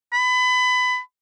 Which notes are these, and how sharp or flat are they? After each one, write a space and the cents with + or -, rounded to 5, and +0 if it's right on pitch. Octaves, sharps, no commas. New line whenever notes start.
B5 +25